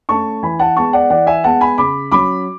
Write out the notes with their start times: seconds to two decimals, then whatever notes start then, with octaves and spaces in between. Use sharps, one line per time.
0.09 A3 C#4 A5 C#6
0.43 E3 G#5 B5
0.60 F#5 A5
0.76 G#3 B3 A5 C#6
0.93 D5 F#5
1.10 E3 D5 F#5
1.27 E5 G#5
1.44 G#3 B3 F#5 A5
1.61 G#5 B5
1.78 C#3 B5 D6
2.11 F#3 C#4 B5 D6